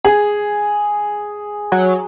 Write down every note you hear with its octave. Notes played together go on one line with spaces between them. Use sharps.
G#4
F#3